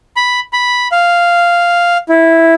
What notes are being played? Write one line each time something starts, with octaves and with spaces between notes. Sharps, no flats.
B5
B5
F5
E4